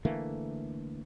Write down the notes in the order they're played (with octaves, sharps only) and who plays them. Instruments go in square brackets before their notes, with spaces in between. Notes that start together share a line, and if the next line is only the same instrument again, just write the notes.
[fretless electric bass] D3 E3 A3 A#3